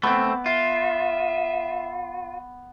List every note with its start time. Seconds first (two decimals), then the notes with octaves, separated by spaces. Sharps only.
0.03 A3 B3 C4 D6
0.46 F4 E5